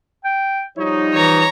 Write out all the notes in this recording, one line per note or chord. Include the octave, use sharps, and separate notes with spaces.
G5
F3 G3 D#4 C#5
E3 C#5 A#5